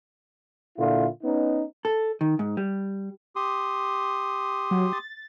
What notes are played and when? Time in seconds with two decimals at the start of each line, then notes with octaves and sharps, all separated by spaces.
0.78 A#2 D3 E4 F4
1.23 B3 C#4 D#4
1.85 A4
2.21 D#3
2.39 G#2
2.57 G3
3.36 G4 C6 D#6
4.71 F#3
4.93 A6